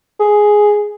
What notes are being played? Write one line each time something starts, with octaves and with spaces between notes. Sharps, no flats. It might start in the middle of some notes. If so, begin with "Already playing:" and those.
G#4